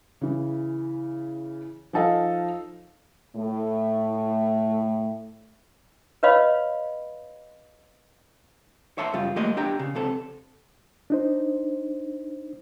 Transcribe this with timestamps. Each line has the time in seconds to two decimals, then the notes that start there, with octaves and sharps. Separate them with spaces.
0.21 C#3 E3
1.93 F3 D#4 A4 D#5 F5
3.36 A2 A3
6.23 B4 C#5 D#5 F5 B5
8.98 C#5 E5 A5 C6
9.14 F#2 C#3 G3 F4
9.36 D#2 G3 A3 A#3 D#5 C6
9.57 D4 G4 G5 A#5
9.79 C#3
9.95 C#2 C3 A4
11.10 D4 D#4 C5